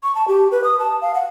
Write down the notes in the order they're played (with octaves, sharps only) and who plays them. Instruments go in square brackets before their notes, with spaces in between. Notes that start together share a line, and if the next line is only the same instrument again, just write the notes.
[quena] C#6
A5
G4
B4
D#6
A5
F5
F#5